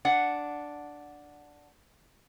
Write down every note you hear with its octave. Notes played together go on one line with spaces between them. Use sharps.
D4 F#5